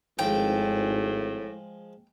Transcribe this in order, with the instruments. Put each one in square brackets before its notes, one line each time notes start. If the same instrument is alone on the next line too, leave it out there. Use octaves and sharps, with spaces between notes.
[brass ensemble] G#1 [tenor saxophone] A2 [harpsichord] F3 G#3 [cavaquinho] G5